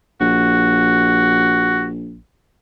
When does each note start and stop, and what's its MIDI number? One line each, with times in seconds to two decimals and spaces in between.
0.20 2.18 34
0.20 1.88 66